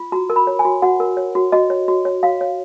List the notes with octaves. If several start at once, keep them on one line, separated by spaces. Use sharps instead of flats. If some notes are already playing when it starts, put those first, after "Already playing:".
Already playing: F4
F#4 A#5
A#4
B5
C#5
G#5
F#4
F#4 F#5
A#4
C#5
F#4
F#4 D#5
C#5
F#4
C#5
F#4 F5
C#5